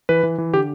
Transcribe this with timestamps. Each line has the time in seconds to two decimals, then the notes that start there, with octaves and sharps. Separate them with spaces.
0.09 E3 B4
0.23 E3
0.38 E3
0.53 D3 G4